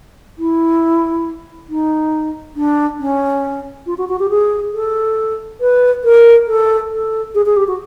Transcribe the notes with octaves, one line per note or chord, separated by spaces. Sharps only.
E4
D#4
D4
C#4
F4
F#4
F#4
G4
G#4
A4
B4
A#4
A4
A4
G#4
G#4
G4
F#4